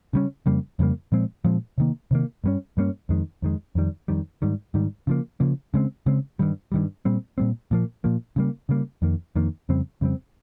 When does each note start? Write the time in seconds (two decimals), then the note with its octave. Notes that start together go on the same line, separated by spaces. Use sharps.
0.13 C#3 G3 C#4
0.46 F2 C#3 G3 A#3
0.79 F2 C#3 G3 A#3
1.12 A#2 F3 G#3 C4
1.45 A#2 F3 G#3 C4
1.78 C3 D#3 A#3
2.11 C3 D#3 A#3
2.44 G2 G3 A#3 C#4
2.77 G2 G3 A#3 C#4
3.09 F2 D#3 G#3
3.42 F2 D#3 G#3
3.75 F2 D#3 G3
4.08 F2 D#3 G3
4.42 G#2 D#3 G3
4.74 G#2 D#3 G3
5.07 C#3 F3 A#3
5.40 C#3 F3 A#3
5.74 C#3 G#3 C4
6.06 C#3 G#3 C4
6.39 G2 D#3 G3
6.72 G2 D#3 G3
7.05 A#2 G3 C4
7.38 A#2 G3 C4
7.71 A#2 F3 A#3
8.04 A#2 F3 A#3
8.36 C#3 G3 A#3
8.69 C#3 G3 A#3
9.02 F2 D#3 A#3
9.36 F2 D#3 A#3
9.69 F2 C#3 G3 C4
10.01 F2 C#3 G3 C4